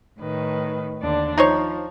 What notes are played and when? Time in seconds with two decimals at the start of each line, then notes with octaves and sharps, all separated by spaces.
0.21 A2 D#3 B4
1.02 D#2 D3 D4
1.38 F3 D#4 C5 C#5